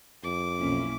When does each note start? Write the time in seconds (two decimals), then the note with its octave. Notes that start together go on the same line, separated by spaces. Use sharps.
0.24 F2 D6
0.59 B1 A#3 C#4 E4